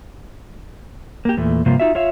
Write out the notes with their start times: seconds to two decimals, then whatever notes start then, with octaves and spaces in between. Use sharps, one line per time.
1.25 A#3 G4
1.37 E2 A#2 A3
1.66 G2 C3 F3 A#3 F4
1.80 D#4 F4 F#4 E5
1.95 F4 C#5 E5 F5